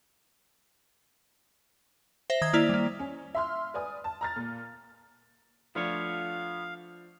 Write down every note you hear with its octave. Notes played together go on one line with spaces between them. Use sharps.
C5 E5 A#6
D#3 D#6 G#6
A#3 E4 D5 F7
G3 A#3
C#4
E5 C6 F6
B4 D5 G#5 D#6
A5
A#5 F6 A6
A#2
F3 A3 B3 D4 F4 C#5 F5